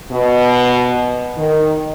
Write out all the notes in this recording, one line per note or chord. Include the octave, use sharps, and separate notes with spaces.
B2
D#3